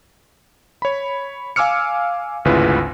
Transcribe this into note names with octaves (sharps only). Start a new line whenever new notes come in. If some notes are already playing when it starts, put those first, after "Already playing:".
C#5 B5
F5 G#5 D6 E6 F6 C#7
G#1 D2 C#3 E4 F4 B4